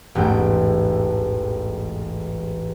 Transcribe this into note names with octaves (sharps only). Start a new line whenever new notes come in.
E1 A1 G#2 A3 G5